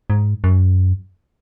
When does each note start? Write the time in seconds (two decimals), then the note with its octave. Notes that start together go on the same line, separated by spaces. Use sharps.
0.10 G#2
0.44 F#2